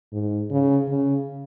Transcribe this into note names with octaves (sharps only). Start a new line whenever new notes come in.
G#2
C#3
C#3